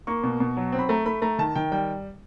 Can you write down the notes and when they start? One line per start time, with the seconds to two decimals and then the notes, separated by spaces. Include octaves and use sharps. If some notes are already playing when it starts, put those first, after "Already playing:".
0.07 A#3 C#6
0.23 B2
0.40 B2
0.57 F#3
0.72 C4
0.79 B5
0.89 A3 A#5
1.06 A3 B5
1.22 A3 A#5
1.38 D#3 A5
1.55 D#3 G5
1.72 G3 G5